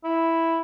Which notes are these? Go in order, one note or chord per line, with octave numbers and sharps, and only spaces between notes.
E4